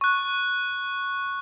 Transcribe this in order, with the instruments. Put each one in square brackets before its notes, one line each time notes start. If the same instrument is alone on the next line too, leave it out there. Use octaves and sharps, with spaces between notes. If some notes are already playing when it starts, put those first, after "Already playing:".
[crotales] C#6 F#6